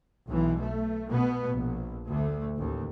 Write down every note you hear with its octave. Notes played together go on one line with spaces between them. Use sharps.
B1 B2 E3
A3
B2 B3
A#1
D2 A3
A1 D#2